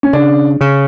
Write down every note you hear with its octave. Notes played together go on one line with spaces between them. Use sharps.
C#4
C#3 D4
C#3